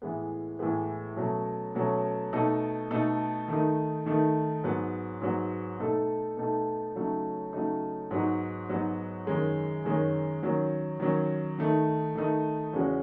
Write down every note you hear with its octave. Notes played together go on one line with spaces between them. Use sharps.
A2 E3 G#3 B3
A2 E3 G#3 B3
B2 F#3 A3 C#4
B2 F#3 A3 C#4
B2 A3 D#4 A4
B2 A3 D#4 A4
D#3 A3 D#4
D#3 A3 D#4
G#2 F#3 B3
G#2 F#3 B3
B2 A3 D#4 A4
B2 A3 D#4 A4
C#3 F#3 A3 D#4
C#3 F#3 A3 D#4
G#2 F#3 B3 D#4 F#4
G#2 F#3 B3 D#4 F#4
F#2 D#3 G#3 C#4
F#2 D#3 G#3 C#4
D#3 F#3 C#4
D#3 F#3 C#4
D#3 A3 D#4
D#3 A3 D#4
E2 C#3 G#3 C#4 F#4